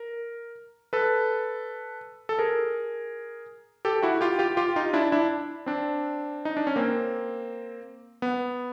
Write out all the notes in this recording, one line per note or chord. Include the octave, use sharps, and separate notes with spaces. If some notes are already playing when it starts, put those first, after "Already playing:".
Already playing: A#4
A4 B4
A4
G#4 A#4
G4 A4
E4 F#4
F4 G4
F4 G4
F4 G4
D#4 F4
D4 E4
D4 E4
C4 D4
D#4
D4
C#4
A#3 C4
B3